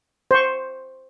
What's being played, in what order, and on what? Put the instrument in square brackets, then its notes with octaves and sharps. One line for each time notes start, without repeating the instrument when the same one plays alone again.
[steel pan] C5 C#6